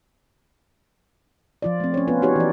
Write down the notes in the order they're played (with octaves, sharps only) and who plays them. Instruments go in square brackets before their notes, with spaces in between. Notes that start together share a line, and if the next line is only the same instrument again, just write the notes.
[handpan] F3 F4 D5
A3 C4
C#4 C#5
B3 F4 B4
D#4 F#4 G4 C#5
E3 D5